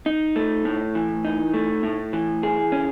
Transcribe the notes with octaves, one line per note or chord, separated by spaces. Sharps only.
D#4
A3
A2
E3
D#4
A3
A2
E3
G#4
C#4